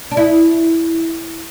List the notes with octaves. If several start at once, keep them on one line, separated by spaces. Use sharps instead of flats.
D4
E4